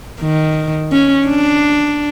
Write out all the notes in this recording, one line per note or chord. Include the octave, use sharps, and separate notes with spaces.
D#3
C#4
D4